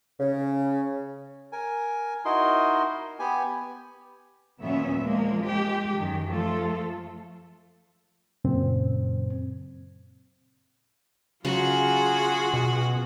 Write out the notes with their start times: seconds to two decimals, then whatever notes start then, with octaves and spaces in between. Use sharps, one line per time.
0.20 C#3
1.52 A#4 G#5
2.25 D#4 E4 F#4 A#4 D#5 C6
3.19 B3 G4 G#5
4.60 D#2 A#2 F#3 B3 C#4 E5
5.02 F3 G#3 A#3
5.43 G#3 G4
5.97 F#2 D#3
6.28 F3 A3 F4 A4
8.44 F#2 A#2 C#3 C4
11.45 C#3 F#3 F4 F#4 G#4
12.54 B2